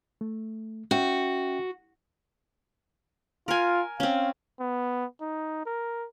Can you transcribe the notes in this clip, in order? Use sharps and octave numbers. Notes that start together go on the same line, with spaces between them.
A3
C#4 F#4 E5 G5
F4 A#4 G#5
C4 C#4 F5
B3
D#4
A#4